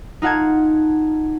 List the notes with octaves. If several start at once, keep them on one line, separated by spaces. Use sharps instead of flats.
D#4 F4 F#5 A5 G#6